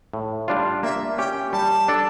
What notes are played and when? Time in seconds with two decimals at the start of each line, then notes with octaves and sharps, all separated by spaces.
0.13 A2
0.48 G3 D4 F4
0.83 A#3 E5
1.18 C#4 G4 G5
1.53 G3 A5
1.88 D4 A4 D5